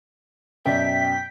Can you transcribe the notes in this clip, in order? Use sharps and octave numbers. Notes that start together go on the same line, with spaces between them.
F#2 B2 D5 E5 G5 B6